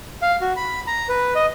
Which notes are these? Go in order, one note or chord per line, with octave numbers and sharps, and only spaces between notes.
F5
F#4
B5
A#5
B4
D#5